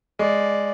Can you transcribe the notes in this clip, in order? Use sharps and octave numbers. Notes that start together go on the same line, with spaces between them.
G#3 D5